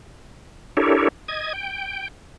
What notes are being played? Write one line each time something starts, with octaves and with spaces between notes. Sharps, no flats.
D4 E4 G4 A4 A#4 C#5
D#5 G#6
G5